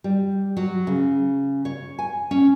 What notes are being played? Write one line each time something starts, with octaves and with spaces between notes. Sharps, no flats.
G3
F#3
C#3
C#5
G#5
C#4